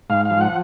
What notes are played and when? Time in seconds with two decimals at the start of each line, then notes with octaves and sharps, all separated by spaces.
0.10 G#2 F5
0.25 F5
0.31 F3
0.41 F#5